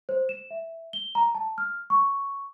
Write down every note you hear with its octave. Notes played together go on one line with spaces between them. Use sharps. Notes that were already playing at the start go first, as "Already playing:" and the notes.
C5
E7
E5
G7
A#5
A5
F6
C#6